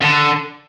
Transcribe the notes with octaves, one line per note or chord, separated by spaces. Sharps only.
D3